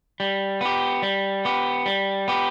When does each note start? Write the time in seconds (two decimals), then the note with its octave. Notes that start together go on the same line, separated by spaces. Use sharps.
0.20 G3
0.61 B3 G4
1.02 G3
1.45 B3 G4
1.86 G3
2.28 B3 G4